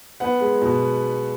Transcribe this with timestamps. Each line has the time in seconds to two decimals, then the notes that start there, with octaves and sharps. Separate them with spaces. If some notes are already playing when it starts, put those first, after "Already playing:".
0.20 B3 F#5
0.41 G#3
0.62 B2